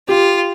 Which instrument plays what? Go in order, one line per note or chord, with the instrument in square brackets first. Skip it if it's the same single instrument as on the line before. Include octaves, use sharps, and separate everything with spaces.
[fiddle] F4 [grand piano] G4